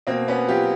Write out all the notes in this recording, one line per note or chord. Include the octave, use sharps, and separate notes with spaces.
B2 A#3 C4
B3 C#4
F#3 F4 G4